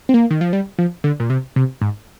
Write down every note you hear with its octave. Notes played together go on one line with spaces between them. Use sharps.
C4
A#3
D#3
F3
G3
F3
D3
A#2
C3
C3
G#2